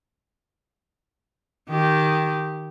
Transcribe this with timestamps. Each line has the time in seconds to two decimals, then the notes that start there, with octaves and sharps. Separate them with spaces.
1.69 D#3 G4